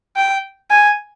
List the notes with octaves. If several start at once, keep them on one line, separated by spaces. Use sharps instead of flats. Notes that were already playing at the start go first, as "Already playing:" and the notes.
G5
G#5